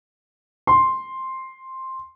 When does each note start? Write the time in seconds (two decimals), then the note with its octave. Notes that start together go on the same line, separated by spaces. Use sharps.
0.67 C6